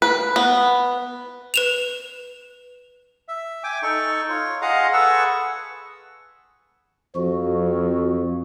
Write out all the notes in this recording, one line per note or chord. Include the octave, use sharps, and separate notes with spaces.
B4
B3
B4 E7 F7
E5
G5 G#5 D6
D#4 A4 C#6
F4 C#5
F4 G#4 D#5 F5 F#5 A#5
G#4 A4 B4 F#5 C#6 E6
F2 F3 F#4